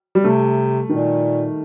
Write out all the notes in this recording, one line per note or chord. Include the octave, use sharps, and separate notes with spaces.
G3
C3 A3
A#2 D#3